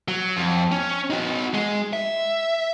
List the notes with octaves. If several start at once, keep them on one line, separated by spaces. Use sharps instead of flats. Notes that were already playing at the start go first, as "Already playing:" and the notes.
F#3
F2
C#4
D#4 F#4
G#3
E5